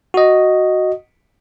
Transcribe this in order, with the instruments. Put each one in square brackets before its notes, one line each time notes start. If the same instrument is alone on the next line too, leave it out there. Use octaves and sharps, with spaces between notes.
[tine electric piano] F#4 D#5